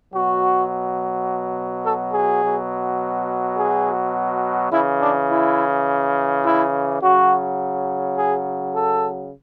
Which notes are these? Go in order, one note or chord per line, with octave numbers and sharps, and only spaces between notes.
B2 F#3 F#4
A4
G#4
B2 F#3
G#4
C#3 E3 E4
D4
E4
E4
C#3 F#3 F#4
G#4
A4